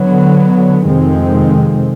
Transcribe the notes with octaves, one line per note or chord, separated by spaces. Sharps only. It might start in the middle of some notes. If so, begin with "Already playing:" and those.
Already playing: D3 F#3 B3
F2 C3 D#3 G#3 C4